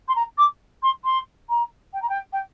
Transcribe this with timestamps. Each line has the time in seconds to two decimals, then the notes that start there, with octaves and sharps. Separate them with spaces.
0.08 C6
0.16 A#5
0.38 D6
0.83 C6
1.05 C6
1.50 A#5
1.94 G5
2.02 A#5
2.09 G5
2.33 G5